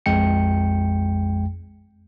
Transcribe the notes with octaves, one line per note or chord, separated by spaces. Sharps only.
A#1 F2 G#3 G5 C#7